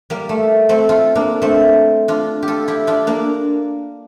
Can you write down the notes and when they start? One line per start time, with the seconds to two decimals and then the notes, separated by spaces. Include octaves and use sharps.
0.10 G3 A#3
0.29 A3
0.69 A3 C4
0.89 F4 A4
1.15 A#3 D4
1.42 A3 C4
2.08 D4 F4
2.43 G4
2.48 F4 A4
2.68 E4 G4
2.87 D4 F4
3.07 A#3 D4